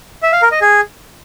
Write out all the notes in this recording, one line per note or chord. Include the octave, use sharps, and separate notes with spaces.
E5
F5
A#4
D#5
G#4